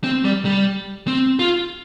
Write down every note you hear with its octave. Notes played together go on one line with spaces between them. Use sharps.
C4
G3
G3
C4
F4